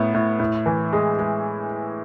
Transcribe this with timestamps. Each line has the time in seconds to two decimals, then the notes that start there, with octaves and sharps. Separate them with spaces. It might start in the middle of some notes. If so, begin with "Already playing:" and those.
Already playing: A2 B3
0.14 A2
0.40 A2
0.66 E3
0.93 G#3
1.19 G#3